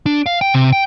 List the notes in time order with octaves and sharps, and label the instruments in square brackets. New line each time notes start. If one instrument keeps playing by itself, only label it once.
[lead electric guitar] D4
F5
G5
C3
G5